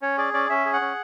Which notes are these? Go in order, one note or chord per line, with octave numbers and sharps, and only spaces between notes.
C#4 C#5
G#4 D5
C#4 D5
C#4 E5
G#4
F#5
C#4